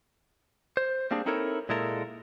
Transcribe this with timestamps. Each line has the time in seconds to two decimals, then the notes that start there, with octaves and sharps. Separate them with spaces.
0.77 C5
1.11 G3 A#3 C4 D4 G#4
1.26 C4 D#4 E4 A4 A#4 C#5
1.69 A#2 G#3 E4 A4 A#4